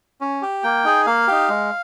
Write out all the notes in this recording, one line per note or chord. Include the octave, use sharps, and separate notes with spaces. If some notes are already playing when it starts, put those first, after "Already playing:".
C#4
G4
A#3 G5
D#4 G#4
A#3 F5
D#4 G4
G#3